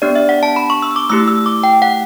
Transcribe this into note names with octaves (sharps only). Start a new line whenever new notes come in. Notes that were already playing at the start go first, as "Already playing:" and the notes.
B3 D4 G4 D5
E5
F#5
A5
B5
C#6
E6
D6
A3 E4 G4 E6
E6
D6
G5
F#5